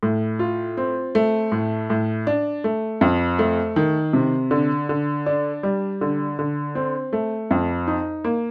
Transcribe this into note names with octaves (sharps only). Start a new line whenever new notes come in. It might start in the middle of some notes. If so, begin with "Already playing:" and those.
A2
F4
C4
A3
A2
A2
D4
A3
F2
A3
D#3
C3
D3
D3
D4
G3
D3
D3
C4
A3
F2
D#4
A#3